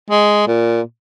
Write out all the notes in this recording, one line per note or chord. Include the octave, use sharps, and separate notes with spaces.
G#3
A#2